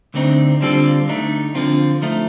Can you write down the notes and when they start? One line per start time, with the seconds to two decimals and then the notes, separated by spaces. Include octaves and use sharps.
0.14 D2 D3 A3 C4 D#4
0.61 D3 G3 C4 F4 A4
1.08 D3 A3 D#4
1.55 D3 F3 C4 F4
2.02 F3 A3 D#4